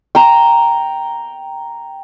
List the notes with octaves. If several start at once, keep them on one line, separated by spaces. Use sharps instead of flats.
G5 A#5